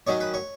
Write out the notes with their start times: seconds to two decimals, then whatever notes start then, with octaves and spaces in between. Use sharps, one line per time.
0.07 D#3 F#3 C#4 C#5
0.20 B4
0.34 C#5